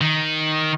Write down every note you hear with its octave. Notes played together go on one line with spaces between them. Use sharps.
D#3